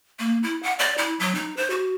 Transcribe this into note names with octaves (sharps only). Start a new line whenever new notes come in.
A#3
E4
F#5
D5
E4
F#3
D#4
C5
F#4